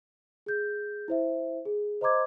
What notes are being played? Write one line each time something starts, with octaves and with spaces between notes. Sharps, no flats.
G#4 G6
E4 C5 E5
G#4
C5 D#5 A#5 C6 D6 G#6